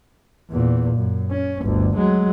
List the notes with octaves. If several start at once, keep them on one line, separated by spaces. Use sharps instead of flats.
E2 A#2
F#2
C#4
G1 D2
F#3 G#3